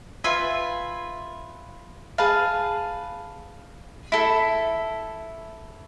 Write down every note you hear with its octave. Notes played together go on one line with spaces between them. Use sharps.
F4 B4 E5 G#5
G#4 B4 F5 A5
E4 A4 E5